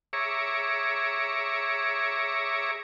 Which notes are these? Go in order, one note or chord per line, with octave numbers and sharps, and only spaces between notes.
G#4 C#5 E5 A#5 C#6 D6